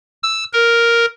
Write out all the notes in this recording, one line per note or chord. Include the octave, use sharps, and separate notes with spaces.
E6
A#4